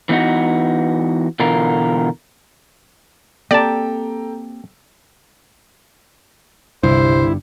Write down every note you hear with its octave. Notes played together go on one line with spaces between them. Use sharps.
E3 B3 D#4 F#4
B2 D3 E3 F4 A#4
A#3 C4 G4 A4 D5 G5 A5 A#5
G1 C2 G2 C3 E4 C5